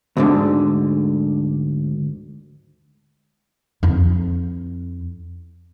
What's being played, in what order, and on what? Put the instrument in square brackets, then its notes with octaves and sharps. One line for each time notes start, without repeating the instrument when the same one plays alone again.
[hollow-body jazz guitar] D2 G#2 D3
[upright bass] F2 E4